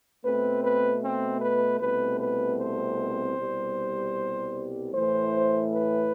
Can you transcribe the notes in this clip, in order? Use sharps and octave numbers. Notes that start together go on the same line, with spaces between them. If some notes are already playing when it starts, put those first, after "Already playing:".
B2 A3 C4 B4
B4
C4
B4
C2 B2 A3 C4 B4
B4
C5
C2 B2 G3
A2 E3 A3 C5
B4